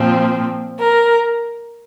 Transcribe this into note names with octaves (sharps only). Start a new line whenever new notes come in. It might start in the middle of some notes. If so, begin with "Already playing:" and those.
Already playing: A#2 F3 C4
A#4